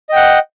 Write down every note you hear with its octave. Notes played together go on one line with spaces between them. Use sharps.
D#5 F#5 G5